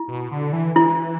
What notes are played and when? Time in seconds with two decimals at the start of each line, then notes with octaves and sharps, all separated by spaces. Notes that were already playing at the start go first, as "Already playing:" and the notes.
Already playing: E4
0.08 B2
0.31 D3
0.53 E3
0.75 E3 E4